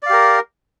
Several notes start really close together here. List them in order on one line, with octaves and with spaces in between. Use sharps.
D5 F5 G4 A#4